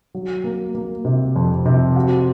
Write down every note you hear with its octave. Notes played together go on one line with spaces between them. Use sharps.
F#3
A#3
A#3
C3
F2
C3
F#4